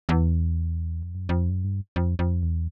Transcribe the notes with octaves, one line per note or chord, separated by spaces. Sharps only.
E2
F2
F#2
F2
F#2
G2
F2
F2
E2